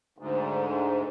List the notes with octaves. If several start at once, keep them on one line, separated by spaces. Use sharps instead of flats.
D2 G#2